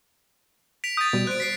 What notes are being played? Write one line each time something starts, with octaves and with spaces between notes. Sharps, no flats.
B6 D7 F7
D#6 G6 A6
B2 G3
C5 F#6 D7
B6 C7 D7